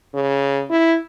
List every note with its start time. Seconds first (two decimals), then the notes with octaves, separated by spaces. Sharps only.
0.14 C#3
0.70 E4